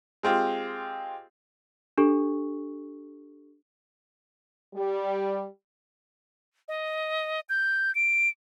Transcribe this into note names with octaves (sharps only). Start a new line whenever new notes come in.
G#3 C4 F4 G4
D4 G4 A4 C#6
G3
D#5
G6
D7